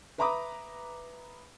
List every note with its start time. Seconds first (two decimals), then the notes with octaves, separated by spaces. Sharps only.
0.18 B4 E5 A#5 B5 D6 D#6